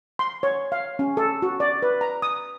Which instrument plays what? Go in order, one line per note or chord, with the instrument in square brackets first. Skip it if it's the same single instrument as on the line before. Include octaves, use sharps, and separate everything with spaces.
[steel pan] C6
C#5
F5
C#4
A4
F#4
D5
B4
A#5
D#6